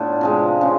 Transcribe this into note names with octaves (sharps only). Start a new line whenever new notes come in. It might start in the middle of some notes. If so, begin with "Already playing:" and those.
Already playing: A2 B3 D4 F4
C3 F3 G#3
C#3 F3